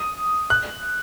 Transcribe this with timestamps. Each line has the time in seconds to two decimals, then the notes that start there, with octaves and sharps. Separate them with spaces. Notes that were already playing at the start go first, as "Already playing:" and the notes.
Already playing: D#6
0.50 F#6